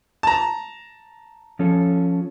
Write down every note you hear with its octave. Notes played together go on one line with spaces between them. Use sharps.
A5 A#5
F3 C#4 A4